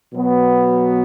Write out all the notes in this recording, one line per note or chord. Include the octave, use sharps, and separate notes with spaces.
B2 F#3 B3